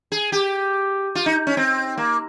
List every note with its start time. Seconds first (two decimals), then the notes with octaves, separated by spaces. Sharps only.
0.12 G#4
0.32 G4
1.15 F4
1.26 D#4
1.47 C#4
1.57 C4
1.98 A#3